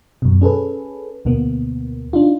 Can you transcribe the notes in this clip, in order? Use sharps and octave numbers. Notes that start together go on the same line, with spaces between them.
F#2 B2
C#4 G#4 A4 B4
D2 B2 A#3 B3
D4 D#4 F4